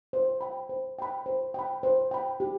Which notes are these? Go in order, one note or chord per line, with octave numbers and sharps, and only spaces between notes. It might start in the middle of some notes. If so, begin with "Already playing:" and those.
C5
G5 B5
C5
G5 B5
C5
G5 B5
C5
G5 B5
G4